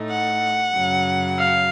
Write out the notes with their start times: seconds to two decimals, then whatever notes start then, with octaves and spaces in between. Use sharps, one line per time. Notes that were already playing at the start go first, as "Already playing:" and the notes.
Already playing: A2 A3 D#4
0.10 F#5
0.75 F#2 C#3 F#3
1.40 F5